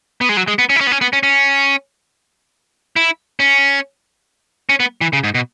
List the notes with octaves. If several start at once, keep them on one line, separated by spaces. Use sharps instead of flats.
B3
G#3
F#3
G#3
B3
C#4
E4
C#4
B3
C#4
B3
C#4
C#4
E4
C#4
C#4
B3
E3
C#3
G#2
B2